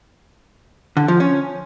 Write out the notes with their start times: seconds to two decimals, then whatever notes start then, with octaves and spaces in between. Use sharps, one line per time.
0.97 D3
1.08 F3
1.20 C#4